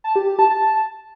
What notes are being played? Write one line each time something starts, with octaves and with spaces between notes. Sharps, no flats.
A5
G4
G4
A5
A5